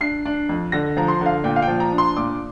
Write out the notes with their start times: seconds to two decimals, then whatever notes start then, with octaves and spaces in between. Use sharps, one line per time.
0.01 D4 C7
0.26 D4
0.49 F2
0.72 D3 A#6
0.97 F3 A#5
1.08 C6
1.21 D3 F5
1.44 A#2 G5
1.56 F5
1.62 G5
1.68 F3
1.80 A#5
1.92 D4
1.98 C6
2.16 A#2 D6